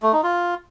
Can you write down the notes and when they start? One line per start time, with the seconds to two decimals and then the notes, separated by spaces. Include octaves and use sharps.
0.03 A3
0.13 D#4
0.23 F4